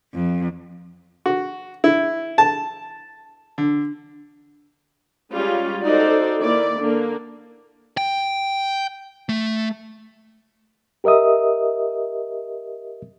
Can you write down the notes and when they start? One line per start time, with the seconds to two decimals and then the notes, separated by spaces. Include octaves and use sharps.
0.14 F2
1.26 F#4
1.84 E4
2.38 A5
3.58 D3
5.31 G3 G#3 C#4 F4
5.84 D#4 F#4 A4 C5 D5
6.41 D#3 A#3 E4 D5
6.80 D3 A#3 D4
7.97 G5
9.29 A3
11.04 G4 A#4 D#5 E5 D#6